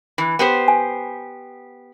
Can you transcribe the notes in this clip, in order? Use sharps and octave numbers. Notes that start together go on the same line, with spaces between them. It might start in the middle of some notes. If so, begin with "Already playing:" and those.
E3
B3 G4 C5
G#5